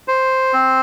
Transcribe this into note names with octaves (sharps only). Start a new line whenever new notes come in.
C5
C4